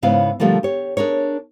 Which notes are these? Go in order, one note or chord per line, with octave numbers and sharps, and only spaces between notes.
G#2 C#3 B3 E4 C5 F5
B2 D3 F3 G3 A3 A#3
G4 C#5
D4 G#4 A#4 C#5